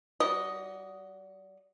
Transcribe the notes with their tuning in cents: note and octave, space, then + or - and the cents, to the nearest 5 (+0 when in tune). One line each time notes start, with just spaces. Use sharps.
G3 -35 F#4 +0 D#5 +0